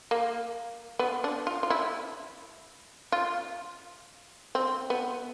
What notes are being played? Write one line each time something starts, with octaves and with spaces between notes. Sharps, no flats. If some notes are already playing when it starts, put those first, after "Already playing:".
A#3
B3
D4
F4
F4
E4
F4
C4
B3